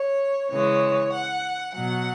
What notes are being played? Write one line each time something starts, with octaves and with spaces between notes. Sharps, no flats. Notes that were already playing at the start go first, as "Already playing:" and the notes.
Already playing: C#5
C#3 E3 G#3 C#5
F#5
B2 F#3 F#5